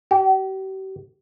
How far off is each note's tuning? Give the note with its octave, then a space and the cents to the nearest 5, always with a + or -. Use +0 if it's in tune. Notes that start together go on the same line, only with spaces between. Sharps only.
G4 -45